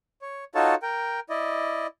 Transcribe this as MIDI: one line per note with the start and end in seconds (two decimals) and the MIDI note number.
0.22 0.44 73
0.55 0.75 63
0.55 0.75 65
0.55 0.75 66
0.55 0.75 69
0.55 0.75 73
0.55 0.75 81
0.82 1.20 70
0.82 1.20 79
1.29 1.87 64
1.29 1.87 74
1.29 1.87 75